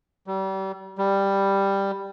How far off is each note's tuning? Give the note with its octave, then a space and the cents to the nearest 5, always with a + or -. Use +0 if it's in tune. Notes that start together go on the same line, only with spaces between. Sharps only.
G3 -35
G3 +5